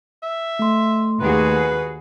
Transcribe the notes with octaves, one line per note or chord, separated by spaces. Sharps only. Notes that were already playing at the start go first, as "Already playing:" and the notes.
E5
A3 C6
D#2 F#4 G#4 B4